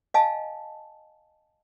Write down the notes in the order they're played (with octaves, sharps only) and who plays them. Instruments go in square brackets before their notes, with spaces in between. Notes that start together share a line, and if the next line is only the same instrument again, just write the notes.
[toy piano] D#5 F5 G#5 A5